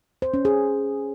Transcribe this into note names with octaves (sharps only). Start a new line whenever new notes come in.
C5
C#4
G#4